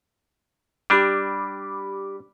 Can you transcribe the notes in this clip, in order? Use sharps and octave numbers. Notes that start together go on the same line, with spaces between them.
G3 D4 G4 B5 D6